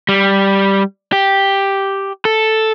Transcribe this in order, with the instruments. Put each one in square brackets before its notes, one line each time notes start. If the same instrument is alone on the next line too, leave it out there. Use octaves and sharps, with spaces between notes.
[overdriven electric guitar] G3
G4
A4